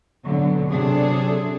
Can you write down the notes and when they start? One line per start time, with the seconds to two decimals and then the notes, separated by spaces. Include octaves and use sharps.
0.24 B2 D3 F#3
0.71 C3 F#3 D4 G#4 A4